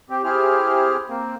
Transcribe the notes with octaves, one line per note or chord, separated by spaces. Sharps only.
C4 G4
C4 E4 G4 G#4 C5 F6
A#3 C4